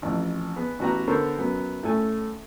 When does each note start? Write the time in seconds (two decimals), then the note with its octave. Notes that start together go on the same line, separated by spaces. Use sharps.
0.02 A1 F2
0.56 B3 G#4
0.79 A1 B3 F#4 G4 A#5
1.07 D3 B3 A4 A#4 C5 C#6
1.37 F#2 F#3 B3
1.83 A2 A3 C#4 A4 G#5